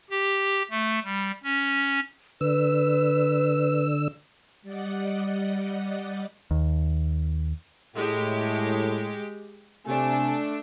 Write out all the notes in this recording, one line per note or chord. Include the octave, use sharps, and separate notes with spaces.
G4
A3
G3
C#4
D3 B4 E6
G3 D5 D#5 F#5
D#2
A2 G#3 G4
C3 A3 D4 G#5